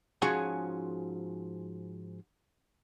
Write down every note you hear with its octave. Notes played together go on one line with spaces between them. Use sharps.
G#2 F3 C#4 F#4 G#4 G#5